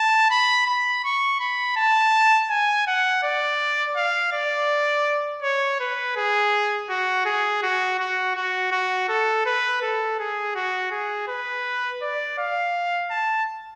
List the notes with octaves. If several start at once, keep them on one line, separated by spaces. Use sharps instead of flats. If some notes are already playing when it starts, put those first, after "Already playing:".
Already playing: A5
B5
B5
C#6
B5
A5
G#5
F#5
D5
F5
D5
C#5
B4
G#4
F#4
G#4
F#4
F#4
F#4
F#4
A4
B4
A4
G#4
F#4
G#4
B4
D5
F5
A5